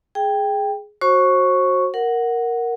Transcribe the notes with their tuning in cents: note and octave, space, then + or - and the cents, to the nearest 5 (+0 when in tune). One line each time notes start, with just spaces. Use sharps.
G#4 +10 G5 +10
F#4 +0 C5 +35 C#6 +0
A#4 +0 F#5 +0